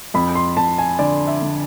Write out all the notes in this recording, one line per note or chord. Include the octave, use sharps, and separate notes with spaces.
F2 B5
C6
F2 A5
G#5
D3 D5
E5
D3